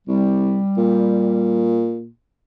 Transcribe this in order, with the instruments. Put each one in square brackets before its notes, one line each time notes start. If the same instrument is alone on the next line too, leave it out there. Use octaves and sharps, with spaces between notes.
[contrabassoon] C2 [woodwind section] G3
[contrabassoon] A#2